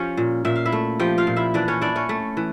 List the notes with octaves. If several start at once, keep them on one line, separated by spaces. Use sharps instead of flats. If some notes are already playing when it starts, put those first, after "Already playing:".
Already playing: F3 C#4 G4 C#5
A#2
A#2 E5
F5
E4 E5
A3
F3 G4 G5
F4 F5
A#2
E4 E5
E3 D4 D5
C#4 C#5
D4 E4 D5
C#4 C#5
A3
E3